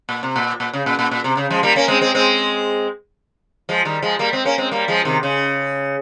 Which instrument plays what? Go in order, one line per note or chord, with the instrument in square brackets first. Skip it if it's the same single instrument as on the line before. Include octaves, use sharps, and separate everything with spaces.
[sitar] A#2
C3
A#2
A#2
C#3
A#2
A#2
A#2
C3
C#3
F3 G#3
G3 A#3
A#3 C#4
G#3 C4
G#3 C4
G#3 C4
F3 G#3
D#3 G3
F3 G#3
G3 A#3
G#3 C4
A#3 C#4
G#3 C4
G3 A#3
F3 G#3
C3 D#3
C#3